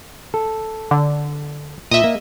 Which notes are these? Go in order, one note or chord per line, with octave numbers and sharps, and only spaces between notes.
A4
D3
A#2 D#5 E5
A#3